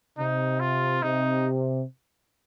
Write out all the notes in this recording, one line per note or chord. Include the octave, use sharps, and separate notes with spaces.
C3 D#4
F4
C3 D#4